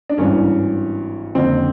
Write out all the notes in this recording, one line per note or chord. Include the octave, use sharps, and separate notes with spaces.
D4
G#1 G2 E3 C#4
F#1 F2 D3 C4